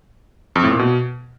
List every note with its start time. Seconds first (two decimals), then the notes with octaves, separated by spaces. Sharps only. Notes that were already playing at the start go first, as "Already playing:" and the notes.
0.56 F2
0.63 A2
0.71 A#2
0.79 B2